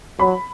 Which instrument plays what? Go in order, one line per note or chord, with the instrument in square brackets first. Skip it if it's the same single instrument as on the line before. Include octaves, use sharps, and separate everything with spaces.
[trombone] F#3 [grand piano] B5